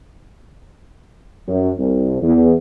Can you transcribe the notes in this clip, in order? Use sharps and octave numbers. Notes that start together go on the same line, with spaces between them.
F#2
C2
E2